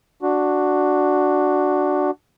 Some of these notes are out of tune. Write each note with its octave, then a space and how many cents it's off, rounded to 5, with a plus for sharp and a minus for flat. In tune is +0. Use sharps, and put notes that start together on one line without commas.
D4 +0 F#4 +0